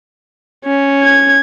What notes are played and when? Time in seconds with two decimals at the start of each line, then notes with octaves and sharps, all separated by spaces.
0.65 C#4
1.03 G#6